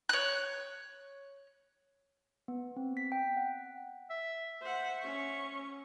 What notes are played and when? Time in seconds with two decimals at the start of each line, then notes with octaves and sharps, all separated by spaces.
0.09 C#5 F#6
2.48 B3
2.76 C4
2.97 B6
3.12 G5
3.37 F#5
4.10 E5
4.61 C5 E5 F#5
5.01 C#4 C#6